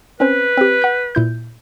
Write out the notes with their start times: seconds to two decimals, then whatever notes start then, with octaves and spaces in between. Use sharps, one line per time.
0.20 C4 C#4 B4 C5
0.57 C4 G4
0.82 F#5 G6
1.15 A#2 E4 G6